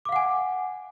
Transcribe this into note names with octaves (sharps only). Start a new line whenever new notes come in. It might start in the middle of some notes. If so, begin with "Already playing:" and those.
F5 F#5 G#5 D6